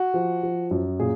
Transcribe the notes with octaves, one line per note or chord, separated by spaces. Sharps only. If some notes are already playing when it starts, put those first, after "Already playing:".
Already playing: F#4
F3
F3
F#2
A#2 G#4